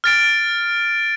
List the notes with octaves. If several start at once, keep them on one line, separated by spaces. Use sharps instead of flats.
F6 A6 D7